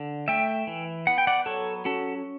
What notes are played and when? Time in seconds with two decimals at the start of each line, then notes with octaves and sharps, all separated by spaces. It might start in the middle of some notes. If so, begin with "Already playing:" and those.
Already playing: D3
0.28 A3 E5 G5
0.67 E3
1.07 B3 F#5
1.18 G5
1.27 D5 F#5
1.46 F#3 A4 C#5
1.85 C#4 F#4 A4